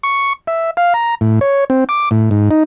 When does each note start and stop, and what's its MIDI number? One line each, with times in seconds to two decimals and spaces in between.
0.03 0.33 85
0.47 0.71 76
0.77 0.93 77
0.94 1.15 82
1.21 1.39 45
1.41 1.64 73
1.70 1.84 60
1.89 2.09 86
2.11 2.30 45
2.31 2.49 44
2.51 2.63 63